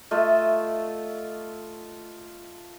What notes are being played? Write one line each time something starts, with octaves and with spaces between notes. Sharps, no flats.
A3 F4 D#5 E5